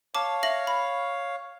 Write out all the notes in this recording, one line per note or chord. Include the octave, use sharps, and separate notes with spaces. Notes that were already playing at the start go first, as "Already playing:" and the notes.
C#5 F5 A5 D6
E5 A#6 F#7
B5